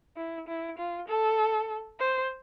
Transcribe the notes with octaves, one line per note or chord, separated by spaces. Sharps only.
E4
E4
F4
A4
C5